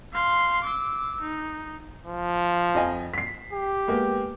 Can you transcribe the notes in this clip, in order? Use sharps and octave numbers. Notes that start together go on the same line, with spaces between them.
F5 C6
D6 E6
D#4
F3
F2 D#5 G#5
B6 C7
G4
G#3 A#3 B3